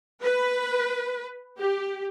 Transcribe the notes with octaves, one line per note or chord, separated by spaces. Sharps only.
B4
G4